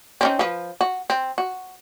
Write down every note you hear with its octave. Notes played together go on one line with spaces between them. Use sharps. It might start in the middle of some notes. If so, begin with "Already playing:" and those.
C4 C#4 D#4
F3 B4
F#4
C4
F#4